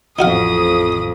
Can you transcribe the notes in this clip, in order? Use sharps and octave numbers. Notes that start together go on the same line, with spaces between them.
A1 F2 D#4 F#4 F5 D#6